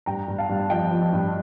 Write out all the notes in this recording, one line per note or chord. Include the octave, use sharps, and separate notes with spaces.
G2 G5 A#5
G2
F5 A5
G2
A5
F3 D#5 G5
F3
G2